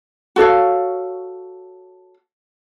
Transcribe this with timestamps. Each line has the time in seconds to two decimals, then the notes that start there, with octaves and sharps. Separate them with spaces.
0.36 F#4 A4 C#5 F5